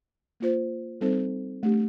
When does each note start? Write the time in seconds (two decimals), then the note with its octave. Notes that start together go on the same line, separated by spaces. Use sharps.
0.40 A#3 F4 C5
1.01 G3 C4 D#4 A4 C5
1.63 A3 D4 G4